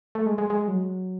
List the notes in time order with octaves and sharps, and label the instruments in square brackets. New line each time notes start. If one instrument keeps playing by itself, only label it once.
[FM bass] A3
G#3
G#3
G#3
F#3